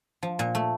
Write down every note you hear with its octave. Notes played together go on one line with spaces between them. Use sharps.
F3
A#2
A3